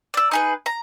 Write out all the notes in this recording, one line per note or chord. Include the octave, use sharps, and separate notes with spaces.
D5 E6
D#4 G#4 B4
A#5